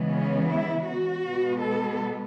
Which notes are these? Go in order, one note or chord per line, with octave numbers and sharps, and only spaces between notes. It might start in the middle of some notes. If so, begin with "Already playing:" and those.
Already playing: C#3 E3 G#3 B3
C#4
E4
F#4
B2 G#3 B3
A4